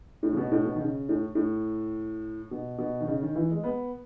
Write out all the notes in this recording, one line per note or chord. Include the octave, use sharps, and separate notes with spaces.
A2
C#3
B2
A2
B2
D#3
C#3
A2
A2
B2
B2
D#3
C#3
D#3
E3
G#3
B3